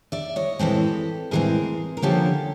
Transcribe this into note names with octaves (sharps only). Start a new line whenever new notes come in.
D5 E5
C#5 D#5
A2 E3 G#3 C4 G4 A4
A2 E3 G#3 C4 G#4 A#4
A#4
D3 F3 A#3 C#4 G4 A4